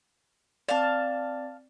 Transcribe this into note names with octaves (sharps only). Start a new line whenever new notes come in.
C4 D5 F5 A5